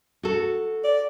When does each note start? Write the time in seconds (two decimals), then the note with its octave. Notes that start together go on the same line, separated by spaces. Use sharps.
0.23 F#4 A4
0.84 D5